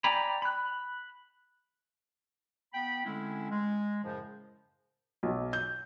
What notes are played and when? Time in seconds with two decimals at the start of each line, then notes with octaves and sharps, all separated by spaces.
0.04 D5 G5 G#5 A#5 B5
0.42 B5 F#6
2.73 B3 G5 B5
3.05 D3 G#3 A3 C4 C#4 E4
3.50 G#3
4.03 F#2 A2 C#3 F3
5.23 B1
5.53 G6